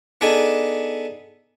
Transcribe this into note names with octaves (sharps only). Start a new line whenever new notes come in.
B3 D4 D#4 G#4 A4